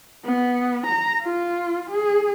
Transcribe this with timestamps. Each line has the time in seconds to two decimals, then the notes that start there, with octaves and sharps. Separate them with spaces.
0.25 B3
0.86 A#5
1.22 F4
1.90 G#4